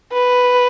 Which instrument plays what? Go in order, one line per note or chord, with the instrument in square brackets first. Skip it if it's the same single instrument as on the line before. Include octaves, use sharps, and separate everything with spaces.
[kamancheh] B4